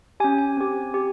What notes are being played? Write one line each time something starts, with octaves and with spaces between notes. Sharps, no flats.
C#4 G4 G#5
G#5
C4 G4
G4